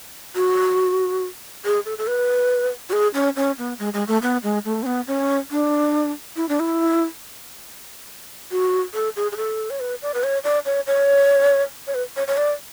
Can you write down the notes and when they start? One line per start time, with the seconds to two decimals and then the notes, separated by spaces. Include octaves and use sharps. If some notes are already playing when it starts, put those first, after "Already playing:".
0.36 F#4
1.65 G#4
1.86 A4
1.98 A4
2.07 B4
2.89 F#4
2.93 G#4
3.14 C#4
3.36 C#4
3.58 B3
3.79 G#3
3.94 G#3
4.08 A3
4.22 B3
4.43 G#3
4.65 A3
4.83 C#4
4.86 B3
5.07 C#4
5.51 D4
6.36 E4
6.49 D4
6.60 E4
8.51 F#4
8.94 A4
9.16 G#4
9.32 G#4
9.37 A4
9.70 C#5
9.80 B4
10.02 D5
10.14 B4
10.24 C#5
10.44 D5
10.66 C#5
10.87 C#5
11.87 C#5
11.95 B4
12.17 C#5
12.28 C#5
12.37 D5